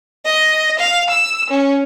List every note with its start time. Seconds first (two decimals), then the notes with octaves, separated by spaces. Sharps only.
0.25 D#5
0.78 F5
1.09 E6
1.49 C#4